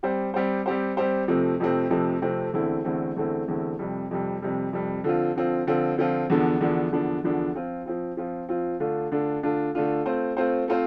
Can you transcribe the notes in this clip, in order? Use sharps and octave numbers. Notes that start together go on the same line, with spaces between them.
G3 C4 G4 C5
G3 C4 G4 C5
G3 C4 G4 C5
G3 C4 G4 C5
F2 C3 F3 A3 C4
F2 C3 F3 A3 C4
F2 C3 F3 A3 C4
F2 C3 F3 A3 C4
E2 D3 A3 C4 E4
E2 D3 A3 C4 E4
E2 D3 A3 C4 E4
E2 D3 A3 C4 E4
F2 C3 G3
F2 C3 G3
F2 C3 G3
F2 C3 G3
D3 F3 C4 F4
D3 F3 C4 F4
D3 F3 C4 F4
D3 F3 C4 F4
E2 D3 F3 B3 D4
E2 D3 F3 B3 D4
E2 D3 F3 B3 D4
E2 D3 F3 B3 D4
F3 C4 F4
F3 C4 F4
F3 C4 F4
F3 C4 F4
D3 A3 D4 F4
D3 A3 D4 F4
D3 A3 D4 F4
D3 A3 D4 F4
A3 C4 F4 C5
A3 C4 F4 C5
A3 C4 F4 C5